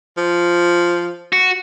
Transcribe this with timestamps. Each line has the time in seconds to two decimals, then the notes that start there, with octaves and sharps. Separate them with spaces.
0.18 F3
1.33 F#4